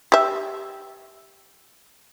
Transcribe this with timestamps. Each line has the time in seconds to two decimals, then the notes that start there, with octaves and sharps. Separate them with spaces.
0.12 G4 E5